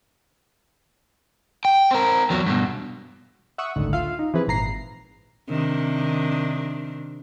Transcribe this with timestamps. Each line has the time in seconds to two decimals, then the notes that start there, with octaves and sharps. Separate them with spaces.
1.65 G5
1.91 C4 A#4
2.30 E2 F#3
2.46 G2 B2
3.58 E5 F#5 C#6 D#6
3.76 G1 C#2 A2 D3 D#3
3.93 F4 E5 F5
4.19 D#4
4.34 E3 F3 C4 G#4 B4
4.47 G#1 A#2 A#5 C7
5.49 C3 D#3 D4